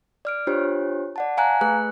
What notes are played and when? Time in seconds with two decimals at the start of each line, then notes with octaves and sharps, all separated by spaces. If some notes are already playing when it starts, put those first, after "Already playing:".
0.25 D5 F6 D7
0.47 D4 F4 G4 C5 C#5
1.16 D5 F#5 A5
1.37 F5 G#5 A#5 F#6
1.61 A3 G#4 B4 F#6